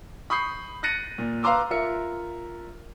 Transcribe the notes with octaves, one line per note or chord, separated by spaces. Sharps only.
B5 C#6 D#6 G6 C7
F#6 A6 A#6 C#7 D#7
A#2
B4 F5 A#5 C6 D6 E6
F4 A#4 E5 C#7